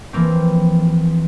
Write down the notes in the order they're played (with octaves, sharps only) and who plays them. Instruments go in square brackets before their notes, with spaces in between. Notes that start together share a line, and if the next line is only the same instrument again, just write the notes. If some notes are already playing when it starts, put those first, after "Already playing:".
[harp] E3 F3 A#3 C4